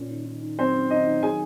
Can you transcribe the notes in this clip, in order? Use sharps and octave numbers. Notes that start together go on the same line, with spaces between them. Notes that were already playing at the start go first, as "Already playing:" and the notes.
Already playing: A#2 C#4
D#3
D#3
D#3
F#3 C4 C5
C#4
D#3 D#4 D#5
D#3
F#3 G#4 G#5